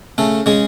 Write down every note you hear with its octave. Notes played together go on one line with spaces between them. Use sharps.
C#3 A3 A4
C#3 G#3 G#4